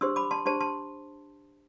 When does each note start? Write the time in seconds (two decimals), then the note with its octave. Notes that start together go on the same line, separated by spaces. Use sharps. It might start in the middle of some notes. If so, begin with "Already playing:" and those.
0.01 D4 G4 C5 C6 E6
0.16 B5 D6
0.31 A5 C6
0.46 D4 G4 C5 A5 C6
0.61 A5 C6